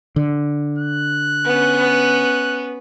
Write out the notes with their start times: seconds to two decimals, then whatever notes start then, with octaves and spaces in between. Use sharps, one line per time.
0.16 D3
0.78 F#6
1.46 B3 C#4